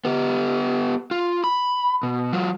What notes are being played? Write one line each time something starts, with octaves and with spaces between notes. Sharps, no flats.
B3 G4
F4
B5
B2
F#3 F4